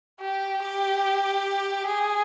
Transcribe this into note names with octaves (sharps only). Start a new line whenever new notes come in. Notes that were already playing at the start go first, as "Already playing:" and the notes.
G4
G4
G#4